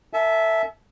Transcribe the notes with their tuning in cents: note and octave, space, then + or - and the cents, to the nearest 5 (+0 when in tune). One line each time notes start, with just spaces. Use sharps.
A4 +40 E5 +0 A5 -40